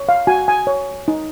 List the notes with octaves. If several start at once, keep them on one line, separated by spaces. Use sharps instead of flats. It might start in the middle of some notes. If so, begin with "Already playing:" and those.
Already playing: C#5
F5
F#4 G#5
G#5
C#5
D#4